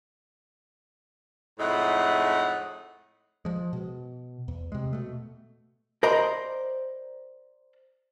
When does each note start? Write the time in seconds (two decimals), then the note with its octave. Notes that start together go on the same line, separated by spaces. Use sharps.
1.60 F2 A2 G#3 D#4 E5 F#5
3.45 F3 G#3
3.73 B2
4.48 E2
4.72 C3 G#3
4.93 B2 A3
6.03 A#4 C5 D5 D#5 A#5 B5